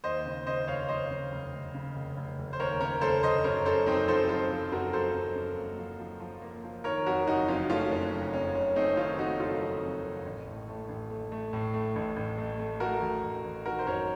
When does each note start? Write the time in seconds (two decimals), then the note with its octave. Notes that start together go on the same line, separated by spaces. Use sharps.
0.04 D#2 C5 D#5
0.26 C#3
0.47 C#3 C5 D#5
0.67 F1 C#5 F5
0.89 F1 C5 D#5
1.10 C#3
1.32 F1
1.53 F1
1.74 C#3
1.96 F1
2.17 F1
2.38 F1
2.53 C5
2.59 D#2 A#4 C#5
2.81 C#3 A#4 C#5
3.01 F1 A4 C5
3.23 F1 C5 D#5
3.44 F#2 A#4 C#5
3.65 F#2 A4 C5
3.86 F#2 C4 D#4
4.08 F3 A4 C5
4.29 F3 A4 C5
4.51 F3
4.72 F#2 F#4 A#4
4.93 F3 A4 C5
5.14 F#2
5.35 F#2
5.57 A#3
5.79 F3
6.00 F3
6.20 F3
6.42 A#3
6.64 F3
6.84 D#3 A#4 C#5
7.06 F2 F#4 A#4
7.27 F#1 D#4 F#4
7.48 F2 C#4 F4
7.70 A3 C#4 F4
7.91 F#1 C#4
8.12 F2
8.33 F2 C#4
8.55 F#1 C#4
8.76 A3 C4 D#4
8.97 D#3 C#4 F4
9.18 A3 D#4 F#4
9.40 F#1 F4 A4
9.61 F2
9.83 F2
10.04 F#1
10.26 A1
10.47 A2
10.68 A3
10.89 A1
11.10 A3
11.32 A3
11.53 A2
11.74 A3
11.96 A1
12.16 A1
12.38 A3
12.59 A3
12.80 A3 F#4 A#4
13.02 A1
13.23 A1
13.44 A1
13.66 D#3 F#4 A#4
13.79 C5
13.87 F#2 A#4 C#5